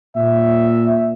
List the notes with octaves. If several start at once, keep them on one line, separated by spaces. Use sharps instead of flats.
A#2 E5